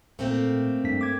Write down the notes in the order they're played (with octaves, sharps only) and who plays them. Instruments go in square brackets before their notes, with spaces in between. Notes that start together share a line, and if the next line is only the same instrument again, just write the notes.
[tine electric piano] A#2 [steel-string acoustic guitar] A3 A#3 C4
[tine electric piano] G2 D4 B6
D6 G#6